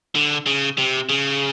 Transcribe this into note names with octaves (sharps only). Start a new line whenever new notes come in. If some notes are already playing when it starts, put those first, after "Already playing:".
D3
C#3
C3
C#3